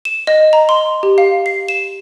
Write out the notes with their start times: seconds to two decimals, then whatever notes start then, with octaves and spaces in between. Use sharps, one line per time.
0.05 E7
0.27 D#5
0.53 A#5
0.69 C6
1.03 G4
1.18 F5
1.46 C7
1.69 E7